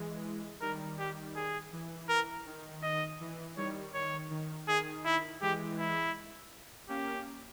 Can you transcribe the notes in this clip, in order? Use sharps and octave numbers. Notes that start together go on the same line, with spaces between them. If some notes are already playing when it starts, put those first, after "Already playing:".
Already playing: E3 G#3
D#3 G3 A#4
G4
G#4
E3
A#4
D#3
D#5
E3
D#3 G3 C#5
D#3 C#5
D#3
D#3 G#4
E4
E3 G#3 G4
E4
A#3 C#4 G4